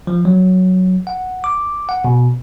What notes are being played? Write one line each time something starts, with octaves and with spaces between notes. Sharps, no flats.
F3
F#3
F#5
D6
F#5
B2